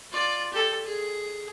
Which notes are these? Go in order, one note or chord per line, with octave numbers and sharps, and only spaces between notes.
F4 D5
G4 A4
G#4